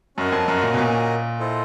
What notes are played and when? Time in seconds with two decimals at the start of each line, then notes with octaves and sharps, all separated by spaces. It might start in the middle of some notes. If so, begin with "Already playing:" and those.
0.17 F#2 C#4 F#4 A#4 D#5 G#5
0.32 F2
0.48 F#2
0.63 A#2
0.74 B2
0.78 A#2
1.39 E4 A4 C5 D#5